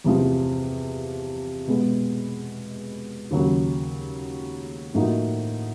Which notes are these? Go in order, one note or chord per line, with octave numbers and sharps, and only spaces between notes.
E2 C3 F3
B2 G#3 B3
D#2 C#3 F#3
A2 F3 A#3 D#4 F#4